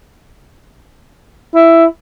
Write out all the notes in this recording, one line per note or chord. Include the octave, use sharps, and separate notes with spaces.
E4